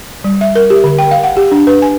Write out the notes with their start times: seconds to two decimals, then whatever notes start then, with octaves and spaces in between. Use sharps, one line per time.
0.24 G3
0.41 E5
0.56 A#4
0.70 G4
0.84 D3
0.99 G5
1.11 F5
1.23 F#5
1.37 G4
1.51 D4
1.67 B4
1.82 G#5